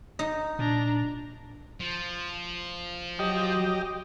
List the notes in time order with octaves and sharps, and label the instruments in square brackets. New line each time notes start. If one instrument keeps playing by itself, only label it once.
[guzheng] D#4
[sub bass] A#2 [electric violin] D4 A#5
[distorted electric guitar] F3
[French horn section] F#3 [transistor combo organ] G4 D#5